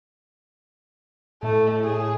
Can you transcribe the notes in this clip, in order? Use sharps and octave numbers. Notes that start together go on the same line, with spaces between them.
A2 A3
G#4